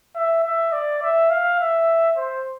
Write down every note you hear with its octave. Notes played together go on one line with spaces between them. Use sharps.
E5
E5
D5
E5
F5
E5
C5